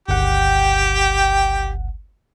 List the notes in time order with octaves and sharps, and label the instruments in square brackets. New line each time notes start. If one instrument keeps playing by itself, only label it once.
[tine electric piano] G1 C#2 F#5 [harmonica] G4 G5